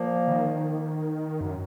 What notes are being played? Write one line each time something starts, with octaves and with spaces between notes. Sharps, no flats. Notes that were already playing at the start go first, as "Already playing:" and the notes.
Already playing: A#2 F3 A#3
D#3
F#2